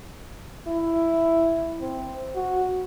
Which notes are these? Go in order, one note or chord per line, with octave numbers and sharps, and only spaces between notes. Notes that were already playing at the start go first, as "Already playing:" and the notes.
E4
C4
F#4